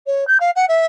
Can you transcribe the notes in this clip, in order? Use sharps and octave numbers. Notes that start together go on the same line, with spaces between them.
C#5
G6
F5
F#5
E5